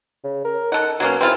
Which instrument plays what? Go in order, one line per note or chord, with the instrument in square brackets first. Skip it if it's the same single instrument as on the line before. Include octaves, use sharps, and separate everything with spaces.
[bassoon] C#3
A#4
[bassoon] D#4 [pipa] A4 F#5
[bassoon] B2 [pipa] F#3 A#3 C#4
[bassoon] E2 [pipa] C4 E4 F4